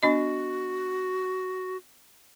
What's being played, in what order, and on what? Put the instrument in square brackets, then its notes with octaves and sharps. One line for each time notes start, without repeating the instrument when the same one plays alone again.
[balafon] B3 D4 D#5 [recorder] F#4